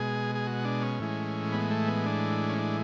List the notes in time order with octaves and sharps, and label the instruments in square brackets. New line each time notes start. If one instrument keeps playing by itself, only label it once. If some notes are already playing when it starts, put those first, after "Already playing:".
Already playing: [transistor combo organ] B2 G#3 G#4
G#4
F#4
D4
C#4
A2 E3 G#3
B3
A3
B3
D4
C#4
D4